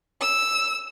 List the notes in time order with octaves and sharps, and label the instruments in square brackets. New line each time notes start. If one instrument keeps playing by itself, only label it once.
[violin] E6